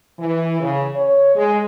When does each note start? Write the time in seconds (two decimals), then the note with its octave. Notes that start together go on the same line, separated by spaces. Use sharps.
0.19 E3
0.60 C#3
0.95 C#5
1.35 G#3